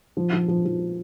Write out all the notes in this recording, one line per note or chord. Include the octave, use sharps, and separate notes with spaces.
F3
F3
F3
F3